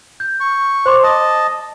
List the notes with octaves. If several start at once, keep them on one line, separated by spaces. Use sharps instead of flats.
G6
C#6
C5 C6 D6
D#5 A5 D#6